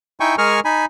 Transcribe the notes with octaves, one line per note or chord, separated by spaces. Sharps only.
D#4 E4 G5 G#5 C#6
G#3 G#4 A#4 G#5 C#6 F6
D#4 G#5 B5